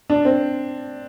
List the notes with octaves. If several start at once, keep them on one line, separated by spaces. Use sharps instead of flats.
D4
C4